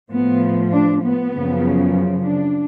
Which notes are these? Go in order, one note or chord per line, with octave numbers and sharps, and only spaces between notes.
A2 F3 B3
D4
B3
F#2 C#3 F3
D4